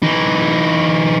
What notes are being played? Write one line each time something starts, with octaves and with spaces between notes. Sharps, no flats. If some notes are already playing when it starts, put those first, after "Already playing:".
E3 D#4